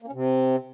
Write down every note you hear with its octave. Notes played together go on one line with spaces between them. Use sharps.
A#3
C#4
C3